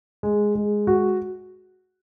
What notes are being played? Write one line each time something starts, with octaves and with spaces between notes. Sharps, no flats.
G#3
G#3
F#4